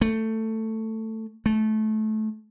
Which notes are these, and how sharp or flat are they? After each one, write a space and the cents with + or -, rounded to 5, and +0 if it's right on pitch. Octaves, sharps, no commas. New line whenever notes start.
A3 +10
A3 -20